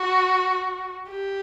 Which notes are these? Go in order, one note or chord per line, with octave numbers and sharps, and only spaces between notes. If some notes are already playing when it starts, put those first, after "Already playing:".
Already playing: F#4
G4